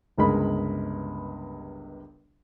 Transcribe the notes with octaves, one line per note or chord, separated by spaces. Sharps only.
G1 C#2 G2 G#3 A#4 B5